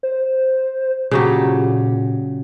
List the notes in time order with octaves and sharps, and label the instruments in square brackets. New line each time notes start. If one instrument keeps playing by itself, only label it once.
[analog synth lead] C5
[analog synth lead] A#2 [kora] C#3 F#3 G4